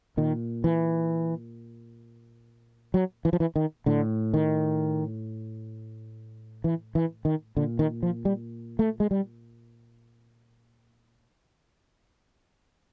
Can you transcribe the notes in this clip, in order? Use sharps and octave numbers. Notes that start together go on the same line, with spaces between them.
A#2 D#3
E3
F#3
E3
F3
E3
D#3
A2 D3
D#3
E3
E3
D#3
A#2 D3
D#3
F3
G3
A3
G#3
G3